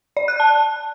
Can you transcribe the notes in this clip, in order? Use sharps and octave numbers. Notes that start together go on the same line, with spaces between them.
D5
F#6
A5